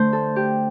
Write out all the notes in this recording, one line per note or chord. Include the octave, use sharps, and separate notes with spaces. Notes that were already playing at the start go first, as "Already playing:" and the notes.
Already playing: D3 A3 C5
A4
G4